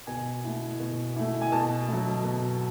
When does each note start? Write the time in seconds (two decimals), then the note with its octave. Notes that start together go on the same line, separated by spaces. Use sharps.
0.07 B2 G#5
0.44 A3 E4
0.80 B2
1.16 A3 E4
1.41 G#5
1.52 B2 A5
1.88 F#3 A3
2.24 B2